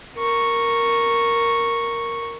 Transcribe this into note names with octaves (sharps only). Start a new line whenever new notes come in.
A#4 C#6